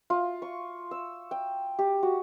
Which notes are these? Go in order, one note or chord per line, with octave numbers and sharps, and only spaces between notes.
F4
C#6
E6
G5
G4
F#4